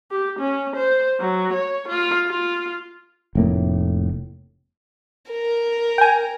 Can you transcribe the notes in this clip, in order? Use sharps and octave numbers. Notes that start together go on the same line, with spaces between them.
G4
C#4
C5
F#3
C#5
F4
F4
F1 A2 A#3
A#4
G5 G#5